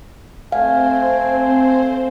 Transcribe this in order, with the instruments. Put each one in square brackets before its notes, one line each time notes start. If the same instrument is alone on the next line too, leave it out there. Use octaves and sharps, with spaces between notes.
[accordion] A3 G#5 [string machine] C4 C5 [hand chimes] F5